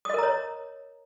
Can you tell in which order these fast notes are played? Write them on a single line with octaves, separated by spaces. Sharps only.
D#6 D#5 A#4 A#5 C#5